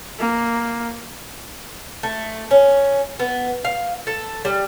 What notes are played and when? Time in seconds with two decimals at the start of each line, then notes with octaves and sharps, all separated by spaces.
0.20 A#3
2.03 A3
2.51 C#4
3.19 B3
3.64 F5
4.07 A4
4.45 G3